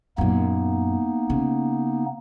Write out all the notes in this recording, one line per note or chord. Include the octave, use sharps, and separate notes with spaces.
F#2 A#2 A#3 B3 D#4
C#3